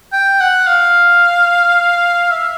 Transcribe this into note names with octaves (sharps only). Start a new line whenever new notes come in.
G5
F#5
F5
E5